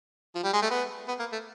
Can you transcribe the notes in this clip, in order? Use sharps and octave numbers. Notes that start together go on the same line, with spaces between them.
F3
G3
G#3
A3
B3
B3
A#3
A3